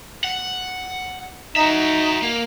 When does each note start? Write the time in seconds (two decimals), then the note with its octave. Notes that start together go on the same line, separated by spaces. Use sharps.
0.24 F#5
1.56 D#4 F#4 E5
2.22 A#3